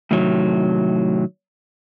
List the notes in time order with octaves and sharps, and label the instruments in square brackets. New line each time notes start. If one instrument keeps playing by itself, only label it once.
[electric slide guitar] A2 C3 D#3 F#3